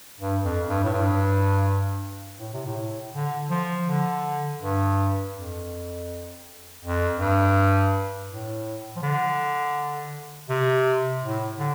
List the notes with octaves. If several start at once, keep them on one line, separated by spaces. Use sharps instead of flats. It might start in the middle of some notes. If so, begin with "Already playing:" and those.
G2
F2
G2
A2
G2
A2
C3
A2
D3
F3
D3
G2
F2
F2
G2
A2
F3
D3
C3
A2
D3